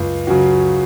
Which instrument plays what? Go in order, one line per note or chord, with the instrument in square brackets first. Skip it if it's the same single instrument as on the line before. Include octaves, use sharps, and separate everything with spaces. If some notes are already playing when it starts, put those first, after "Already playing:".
Already playing: [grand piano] C#2 [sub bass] F#2
[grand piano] C#3 F#3 C#4 F#4